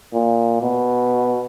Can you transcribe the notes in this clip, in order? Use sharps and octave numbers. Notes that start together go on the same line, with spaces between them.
A#2
B2